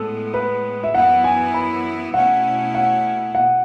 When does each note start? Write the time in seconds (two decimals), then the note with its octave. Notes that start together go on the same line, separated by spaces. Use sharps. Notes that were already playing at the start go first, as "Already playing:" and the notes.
Already playing: A2 G#3 B3 A4
0.34 B4
0.84 E5
0.94 F#2 E3 B3 E4 F#5
1.24 G#5
1.54 B5
2.14 B2 A3 C#4 E4 F#5
2.75 F#5
3.34 B2 F#5